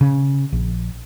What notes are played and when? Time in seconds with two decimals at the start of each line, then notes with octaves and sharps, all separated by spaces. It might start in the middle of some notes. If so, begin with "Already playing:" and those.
0.01 C#3
0.52 A#1